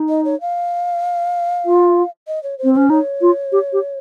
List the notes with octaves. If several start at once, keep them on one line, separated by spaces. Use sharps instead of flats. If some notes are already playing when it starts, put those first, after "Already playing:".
Already playing: D#4
D#5
C#5
F5
F4
D#5
C#5
C5
C4
C#4 C5
D#4 C#5
F4
G4
G4